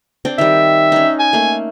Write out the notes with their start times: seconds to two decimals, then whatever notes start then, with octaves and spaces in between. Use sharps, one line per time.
0.25 C4 D4 G5
0.38 D#3 G3 E5
0.92 C#4 D#4
1.20 G#5
1.33 A3 A#3